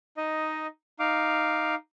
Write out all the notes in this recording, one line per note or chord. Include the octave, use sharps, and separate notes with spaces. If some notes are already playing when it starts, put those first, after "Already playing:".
D#4 D#5
D#4 F5 D6